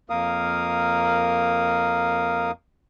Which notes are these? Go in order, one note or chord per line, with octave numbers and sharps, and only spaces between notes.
F2 A#3 A#4 F5 D#6